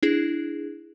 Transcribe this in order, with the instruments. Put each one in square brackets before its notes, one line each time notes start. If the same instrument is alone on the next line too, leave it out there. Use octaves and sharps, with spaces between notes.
[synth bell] D4 E4 G#4